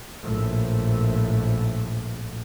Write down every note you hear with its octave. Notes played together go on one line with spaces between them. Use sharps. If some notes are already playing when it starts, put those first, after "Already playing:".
A#1 A2